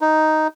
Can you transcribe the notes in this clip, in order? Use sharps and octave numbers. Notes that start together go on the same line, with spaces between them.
D#4